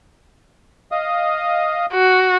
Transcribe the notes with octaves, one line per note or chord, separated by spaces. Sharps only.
D#5 F5 D#6
F#4